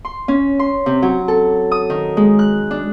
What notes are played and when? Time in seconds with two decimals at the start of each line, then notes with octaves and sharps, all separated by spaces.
0.05 C6
0.28 C#4
0.59 C6
0.86 C3
1.02 F#3
1.28 A4
1.72 D#6
1.90 D#3
2.17 G#3
2.39 F#6
2.71 D4